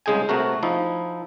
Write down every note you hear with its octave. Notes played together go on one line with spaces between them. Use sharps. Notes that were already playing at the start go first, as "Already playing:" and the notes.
C2 C#3 G#3 G#4 G5 G#5
C3 A3 F#4 A#4
F3 D#4 E4